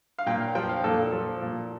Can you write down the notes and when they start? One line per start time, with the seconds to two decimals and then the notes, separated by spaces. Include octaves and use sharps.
0.19 F5
0.26 A#2 G5
0.40 F5
0.55 F3 G5
0.69 F5
0.84 A#2 A4
1.12 F3
1.42 A#2